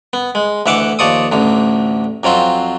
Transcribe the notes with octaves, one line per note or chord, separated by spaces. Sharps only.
B3
G#3
D2 E3 E5 F#5 D6
D#2 F3 D5 C#6 D#6
A1 D2 D3
F2 F#3 C4 F4